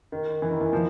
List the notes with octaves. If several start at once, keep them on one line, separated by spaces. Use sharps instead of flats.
D#3
E3
D#3
E3
F3